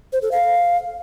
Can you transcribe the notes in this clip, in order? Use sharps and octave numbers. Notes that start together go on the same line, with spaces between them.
C5
A4
F5